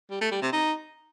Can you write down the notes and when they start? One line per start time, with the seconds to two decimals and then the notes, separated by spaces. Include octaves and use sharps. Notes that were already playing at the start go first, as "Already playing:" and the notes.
0.10 G3
0.21 A3
0.31 G3
0.42 C3
0.52 D#4